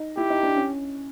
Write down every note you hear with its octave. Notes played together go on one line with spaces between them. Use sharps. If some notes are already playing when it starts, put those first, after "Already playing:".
Already playing: D#4
E4 G4
D#4
D4
C#4